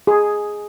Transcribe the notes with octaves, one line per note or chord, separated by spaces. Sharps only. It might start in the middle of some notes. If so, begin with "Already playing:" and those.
G#4